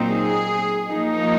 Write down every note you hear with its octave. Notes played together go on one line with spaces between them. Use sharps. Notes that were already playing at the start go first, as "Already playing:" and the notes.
Already playing: A#2 F#3 C4 D#4
G#4
F3 A#3 D#4